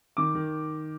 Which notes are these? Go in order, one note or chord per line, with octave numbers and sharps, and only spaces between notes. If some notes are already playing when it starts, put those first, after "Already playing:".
D#3 D6
D#3